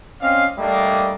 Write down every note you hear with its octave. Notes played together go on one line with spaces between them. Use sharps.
C4 C#4 D5 D#5 F5
G3 A3 A#3 D4 D#5